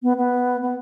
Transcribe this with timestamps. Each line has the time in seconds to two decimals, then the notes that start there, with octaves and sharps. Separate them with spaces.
0.03 B3
0.17 B3
0.62 B3